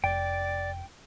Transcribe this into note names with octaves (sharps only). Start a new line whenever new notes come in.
F1 D5 G5